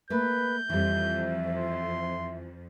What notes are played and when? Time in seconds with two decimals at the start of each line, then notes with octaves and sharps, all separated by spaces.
0.10 A3 A#3 B4 G6
0.70 F2 E3 G3 E5
1.56 C6